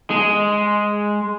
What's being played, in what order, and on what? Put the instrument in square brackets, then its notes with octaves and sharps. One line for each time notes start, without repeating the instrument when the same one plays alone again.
[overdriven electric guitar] G#3